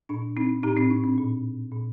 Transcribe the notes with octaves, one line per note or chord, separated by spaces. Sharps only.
A#2 D4
C4 D#4
A2 D#4 G4
C4 D#4
D4
C4
A#2
A#2